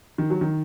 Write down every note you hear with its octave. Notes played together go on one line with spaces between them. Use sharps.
D#3
F#3
D#3